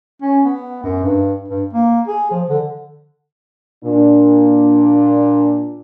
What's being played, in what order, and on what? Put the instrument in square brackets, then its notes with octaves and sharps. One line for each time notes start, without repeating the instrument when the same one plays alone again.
[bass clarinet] C#4
B3
F#2
G2
G2
A#3
G#4
F3
D3
[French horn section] A#2 D4